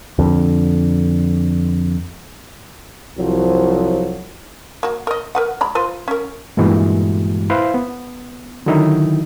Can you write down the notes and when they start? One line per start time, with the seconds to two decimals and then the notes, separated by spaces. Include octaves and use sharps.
0.19 F2 D3
3.18 C2 F3 F#3
4.83 A#3 F#4
5.07 A#4 D#5
5.35 A#4 B4 F#5
5.61 G#3 A#5 B5
5.75 F4 B4 C5
6.08 C#4 A#4
6.57 G2 A#2 E3 G#3 B3 F#4
7.50 E4 B4 C5 F5
7.74 B3
8.66 D3 D#3 F#3 D#4 E4